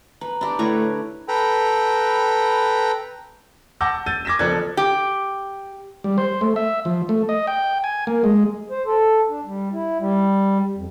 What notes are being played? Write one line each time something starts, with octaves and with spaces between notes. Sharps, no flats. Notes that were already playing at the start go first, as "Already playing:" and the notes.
B4 A#5
D4 E4 G4
A2 D3 B4 C#5 A#5
A4 B4 G5 A#5 B5
F#5 A5 D6 E6 G6 A#6
E6 G6 A6 D#7
D6 G#6 A#6 B6 E7
F#1 F3 A4 D5 F#6 G#6
G4
G3
C5
A3
E5
F3
A3
D#5
G5
G#5
A#3
G#3
C5
A4
D4
G3
E4
G3
F2